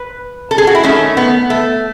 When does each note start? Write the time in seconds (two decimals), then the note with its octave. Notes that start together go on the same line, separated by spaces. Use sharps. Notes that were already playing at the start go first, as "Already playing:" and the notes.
Already playing: B4
0.51 A4
0.58 G#4
0.67 F#4
0.75 E4
0.83 D#3 A3 C#4
1.17 B3
1.50 A3